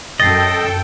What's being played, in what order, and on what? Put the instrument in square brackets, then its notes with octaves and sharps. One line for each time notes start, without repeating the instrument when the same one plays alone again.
[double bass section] F#2 [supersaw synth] A4 G5 [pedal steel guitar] D#5 [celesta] A6 C7